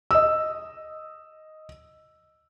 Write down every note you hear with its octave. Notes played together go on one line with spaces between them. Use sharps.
D#5 E6